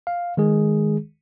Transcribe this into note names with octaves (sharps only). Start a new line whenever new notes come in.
F5
D#3 G#3 G#4